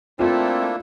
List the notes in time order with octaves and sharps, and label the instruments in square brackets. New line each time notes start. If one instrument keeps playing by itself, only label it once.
[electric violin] A3 A4 [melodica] A#3 D4 E4 [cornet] C4 [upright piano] F4